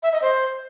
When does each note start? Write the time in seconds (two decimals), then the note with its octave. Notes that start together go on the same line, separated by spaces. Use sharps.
0.03 E5
0.12 D#5
0.22 C5